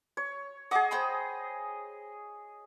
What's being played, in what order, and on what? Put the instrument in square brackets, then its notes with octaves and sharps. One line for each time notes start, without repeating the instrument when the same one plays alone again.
[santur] C#5
[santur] G#4 D#5 [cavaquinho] F#5 D6
[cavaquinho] C5 G5 B5